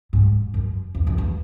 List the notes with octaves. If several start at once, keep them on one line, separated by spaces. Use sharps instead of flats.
G#2
F#2
E2
F2
E2